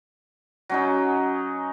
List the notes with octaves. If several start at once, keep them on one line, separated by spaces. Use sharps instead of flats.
F#3 C#4 D#4